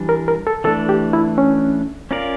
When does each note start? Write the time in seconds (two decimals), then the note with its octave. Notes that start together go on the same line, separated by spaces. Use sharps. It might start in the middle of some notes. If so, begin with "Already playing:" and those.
Already playing: E3 G3 D4
0.09 A#4
0.28 A#4
0.47 A4
0.64 E3 A3 D4 A4
0.89 G4
1.13 E4
1.38 C#4
2.11 C#4 F4 A#4 D5 F5